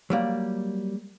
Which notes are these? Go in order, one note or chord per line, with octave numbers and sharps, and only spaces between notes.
F#3 G3 A#3